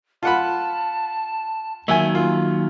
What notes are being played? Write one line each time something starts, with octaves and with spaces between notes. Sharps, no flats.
F4 F#5 A5 B5
D#3 F#3 A#3 E5 G#5
F4